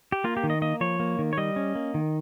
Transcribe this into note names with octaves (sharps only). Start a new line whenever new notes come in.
G4
A#3 F4
G4
D#3
D#5
A#3 D#5
F3 C#5
A#3
D#3
C#5
G3 D#5
C#4
A#3
D#3